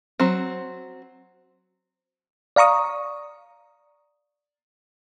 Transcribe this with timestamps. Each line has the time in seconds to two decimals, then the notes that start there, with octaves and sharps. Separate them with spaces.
0.20 F#3 C4
2.56 D5 F5 A#5 C#6 D#6